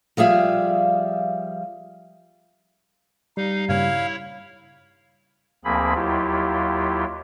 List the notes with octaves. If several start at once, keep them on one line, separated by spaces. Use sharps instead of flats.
F3 G3 G#4 E5 F5
G3 D#4 F5
G2 A#2 C#3 E4 C#5 F5
D2 F3 A#3 C4 G#4 B5
D#2 F#3 E4 F4 G4